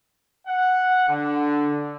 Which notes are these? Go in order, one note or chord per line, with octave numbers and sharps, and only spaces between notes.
F#5
D3